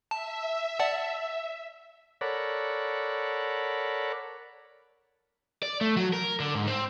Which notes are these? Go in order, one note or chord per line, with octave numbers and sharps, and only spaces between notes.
E5 A5
D5 F#5 A5
A4 A#4 C#5 D5 F#5 B5
D5
A3
F#3
A#4
D3
G#2
C4